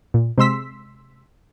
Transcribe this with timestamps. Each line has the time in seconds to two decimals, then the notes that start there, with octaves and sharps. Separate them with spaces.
0.14 A#2
0.38 C3 G#3 C6 E6 B6